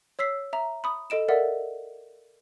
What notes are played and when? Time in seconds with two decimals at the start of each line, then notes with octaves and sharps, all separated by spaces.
0.19 C#5 E6 B6 C7
0.53 E5 A#5
0.84 B5 D#6
1.10 A4 D#5 D7 E7
1.28 A4 A#4 D5 E5 F#5